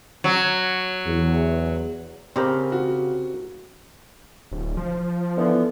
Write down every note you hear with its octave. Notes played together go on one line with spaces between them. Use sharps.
F#3
E2
C#3 C4 G4 A#4
F#4
D1
F3
D3 E3 B3